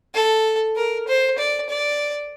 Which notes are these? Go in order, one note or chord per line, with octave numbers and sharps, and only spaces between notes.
A4
A#4
C5
D5
D5